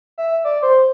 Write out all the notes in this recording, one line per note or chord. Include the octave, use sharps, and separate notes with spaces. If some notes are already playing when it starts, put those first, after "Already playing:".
E5
D5
C5